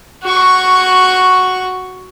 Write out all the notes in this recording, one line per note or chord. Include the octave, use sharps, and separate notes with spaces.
F#4 C#6